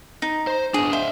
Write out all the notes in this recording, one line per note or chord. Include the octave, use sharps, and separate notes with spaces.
D#4
C5
B3 D4 G#4
C5 E5 F5